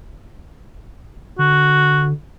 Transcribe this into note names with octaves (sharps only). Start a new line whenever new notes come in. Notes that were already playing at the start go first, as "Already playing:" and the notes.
D3 F#4